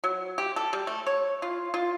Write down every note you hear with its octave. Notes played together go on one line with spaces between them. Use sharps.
F#3
G4
A4
G3
A3
C#5
F4
F4